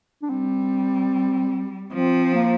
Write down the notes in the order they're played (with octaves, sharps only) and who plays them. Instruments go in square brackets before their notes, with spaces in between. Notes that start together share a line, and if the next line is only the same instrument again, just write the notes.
[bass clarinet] D4
[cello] G3 [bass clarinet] C4
[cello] F3 [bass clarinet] C4
[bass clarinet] A#3